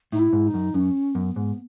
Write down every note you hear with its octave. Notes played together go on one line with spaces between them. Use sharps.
A2 D#4
E4
G#2
D#4
F#2
F#2 C#4
F#2 B3
G#2